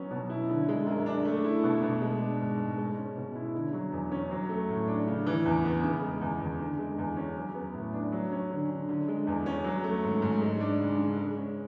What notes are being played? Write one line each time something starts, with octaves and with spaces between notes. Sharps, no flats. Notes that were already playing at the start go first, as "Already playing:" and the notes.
Already playing: F#3 B3 C#4
B2
E4
D3
G#3
F#2
D4
A3
E4
B2
B2
G#3
D4
G#2
G#2
G#3
C#4
B2
E4
D3
F#3
E2
C#4
F#3
A3
A2
D4
C#3
E3
E2
B3
C#3
G#3
E2
E2
D3
G#3
E2
C#4
F#3
B3
A2
D4
F#3
C#4
D3
D3
D3
G#3
E2
C#4
F#3
A3
G#2
G#2
G#3
D4
C#3
C#3
G#3
C#4